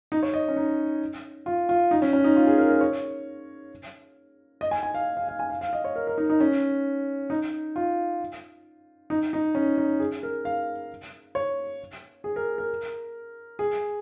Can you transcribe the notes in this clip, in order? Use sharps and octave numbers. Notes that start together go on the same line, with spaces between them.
D#4
C#5
D#5
C#4
D#4
F4
F4
D#4
C#4
C#4
D#4
F4
G#4
A#4
A#4
C#5
D#5
G#5
G#5
F5
F5
F5
G#5
F5
F5
D#5
C#5
A#4
A#4
D#4
D#4
C#4
D#4
F4
D#4
D#4
C#4
D#4
G#4
A#4
F5
C#5
G#4
A#4
A#4
G#4